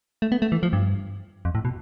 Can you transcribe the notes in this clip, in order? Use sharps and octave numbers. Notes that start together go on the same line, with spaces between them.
A3
B3
A3
E3
F3
G2
F2
A2
B2